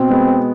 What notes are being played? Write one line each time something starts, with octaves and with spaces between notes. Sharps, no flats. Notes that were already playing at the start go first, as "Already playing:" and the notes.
Already playing: B2 C4
G#3 B3